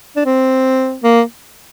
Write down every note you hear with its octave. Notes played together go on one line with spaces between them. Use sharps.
D4
C4
A#3